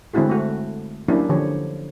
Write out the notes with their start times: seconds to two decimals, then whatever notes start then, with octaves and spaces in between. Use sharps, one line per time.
0.14 D3 G#3 C4 E4 F#4 G#4
0.29 A3 F#4
1.09 F#3 A#3 C#4 D4 E4 G4
1.29 D3 F3 G4 C#5